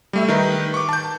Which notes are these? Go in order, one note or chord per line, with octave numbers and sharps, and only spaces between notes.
G3 A3 E5
D#3 D#4 B4
C#6 D6
A5 G6